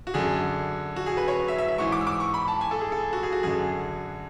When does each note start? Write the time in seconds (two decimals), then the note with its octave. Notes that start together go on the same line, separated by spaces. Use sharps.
0.07 F#4
0.14 F#2 D3 G#4
0.96 F#4
1.06 G#4
1.17 B4
1.28 C#5
1.48 E5
1.58 E5
1.68 E5
1.78 G#2 E3 C#6
1.92 D6
2.01 E6
2.07 D6
2.20 C#6
2.34 B5
2.48 A5
2.61 G#5
2.71 A4
2.81 G#4
2.92 A4
3.13 F#4
3.23 G#4
3.33 F#4
3.43 F#2 D3 G#4